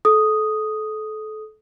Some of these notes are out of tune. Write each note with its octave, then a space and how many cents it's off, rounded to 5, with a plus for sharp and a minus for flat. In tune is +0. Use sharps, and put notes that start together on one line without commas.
A4 -25 D#6 +0